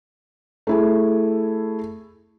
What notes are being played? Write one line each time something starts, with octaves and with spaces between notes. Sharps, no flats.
A3 E4 G#4